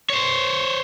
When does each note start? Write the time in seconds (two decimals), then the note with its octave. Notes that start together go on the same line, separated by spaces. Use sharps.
0.10 C5 C#5